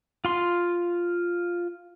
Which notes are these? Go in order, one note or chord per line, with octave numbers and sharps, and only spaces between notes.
F4 C6